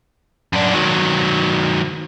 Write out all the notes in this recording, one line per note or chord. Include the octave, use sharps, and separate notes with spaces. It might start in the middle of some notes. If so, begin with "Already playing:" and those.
F#2 D4
D#3 F#3